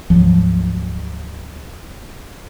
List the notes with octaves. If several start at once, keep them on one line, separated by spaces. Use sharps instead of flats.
D2 G#2 F3 F#3